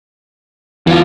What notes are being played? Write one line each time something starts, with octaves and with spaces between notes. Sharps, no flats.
E2 E3 F4